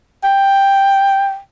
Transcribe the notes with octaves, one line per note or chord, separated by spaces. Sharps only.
G5